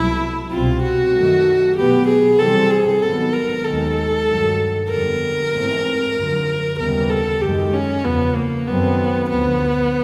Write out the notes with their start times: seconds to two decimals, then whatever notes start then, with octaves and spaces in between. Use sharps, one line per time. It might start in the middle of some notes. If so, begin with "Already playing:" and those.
Already playing: C2 B2 F#3 A3 E4
0.50 C2 B2 G3 C4 F4
0.82 F#4
1.13 F#2 D#3 F#3 A3
1.76 B2 F#3 B3 G4
2.08 G#4
2.39 C3 E3 G3 C4 A4
2.70 G#4
3.02 G#2 D#3 F#3 B3 A4
3.33 A#4
3.64 D#2 D#3 G#3 A4
4.27 G2 D#3 F#3
4.90 F2 D3 G3 B3 A#4
5.54 G#2 E3 A3 C4
6.16 F#2 D3 F3
6.79 D#2 C#3 E3 G3 B3 A#4
7.10 A4
7.41 F#2 D#3 G#3 G4
7.73 C#4
8.04 E2 C#3 F3 B3
8.35 A#3
8.67 F#2 D#3 F#3 A3 B3 C4
9.30 D2 D3 F3 B3